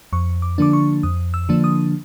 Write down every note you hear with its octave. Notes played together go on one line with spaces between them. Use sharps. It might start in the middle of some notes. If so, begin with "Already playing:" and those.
F2 C#6
D6
D3 F3 A#3 D4 D6
C#6
F2 D#6
E6
D3 F3 A#3 D4
D#6